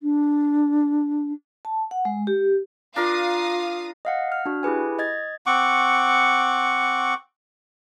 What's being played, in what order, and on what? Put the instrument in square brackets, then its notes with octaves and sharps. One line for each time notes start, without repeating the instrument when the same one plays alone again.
[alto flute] D4
[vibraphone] A5
F#5
G#3
G4
[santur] D4 A#4 [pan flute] F4 [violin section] F5 D#6
[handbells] D#5 F5 F#5
F6
D4 F#4
E4 G4 G#4 B4 G#5
D#5 G#6 A6
[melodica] C4 F#5 C#6 D6